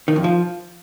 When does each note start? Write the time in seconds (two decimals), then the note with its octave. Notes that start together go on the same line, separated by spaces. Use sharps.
0.08 D#3
0.16 F2
0.24 F3